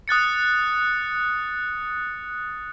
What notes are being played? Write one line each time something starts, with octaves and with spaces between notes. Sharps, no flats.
D#6 F#6 A6 C#7